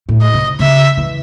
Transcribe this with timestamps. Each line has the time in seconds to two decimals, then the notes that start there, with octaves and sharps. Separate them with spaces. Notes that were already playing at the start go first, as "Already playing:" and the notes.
0.09 A2
0.21 D#5
0.34 C3
0.59 C#3 E5
0.97 E3